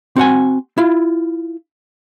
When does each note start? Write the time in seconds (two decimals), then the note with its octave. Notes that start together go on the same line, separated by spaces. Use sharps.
0.16 C4 F#4 F#5 G#5
0.78 E4 F4